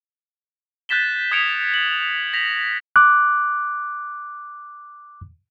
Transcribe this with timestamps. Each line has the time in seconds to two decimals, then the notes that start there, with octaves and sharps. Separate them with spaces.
0.89 F#6 G6 A6 B6 E7 G7
1.32 D#6 G#6 B6 C#7 D7 F7
1.74 F#7
2.33 A#6 B6 F7
2.96 D6 F#6